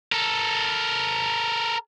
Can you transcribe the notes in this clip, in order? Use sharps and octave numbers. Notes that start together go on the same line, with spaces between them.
A4 A#4